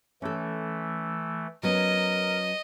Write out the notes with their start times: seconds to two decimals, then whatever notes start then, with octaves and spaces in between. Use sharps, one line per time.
0.22 E3 A3 C#4 A4
1.63 F#3 B3 C#4 A#4 D#5